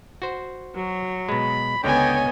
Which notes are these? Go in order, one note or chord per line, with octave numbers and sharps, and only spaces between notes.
F#4 C5
F#3
B2 G#3 B5
C#2 D3 B3 C#5 D#5 G5 G#5